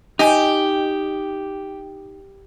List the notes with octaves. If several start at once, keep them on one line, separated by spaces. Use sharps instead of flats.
D#4 G4 D#5 G#5